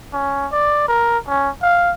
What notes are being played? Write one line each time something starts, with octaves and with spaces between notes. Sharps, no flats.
C#4
D5
A#4
C#4
F5